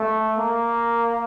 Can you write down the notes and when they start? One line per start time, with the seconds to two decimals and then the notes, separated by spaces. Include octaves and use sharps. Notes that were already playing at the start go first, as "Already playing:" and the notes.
Already playing: A3
0.38 A#3